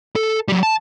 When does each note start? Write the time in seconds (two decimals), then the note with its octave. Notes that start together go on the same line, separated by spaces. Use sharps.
0.16 A4
0.48 F#3 G3
0.63 A5